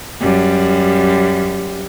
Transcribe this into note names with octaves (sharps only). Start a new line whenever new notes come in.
F#2 G3